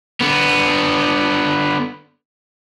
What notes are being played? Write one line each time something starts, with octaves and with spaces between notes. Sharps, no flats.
D3 B3